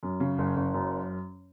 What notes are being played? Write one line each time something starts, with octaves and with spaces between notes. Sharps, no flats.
F#2
C#3
F#1
F#1
F#2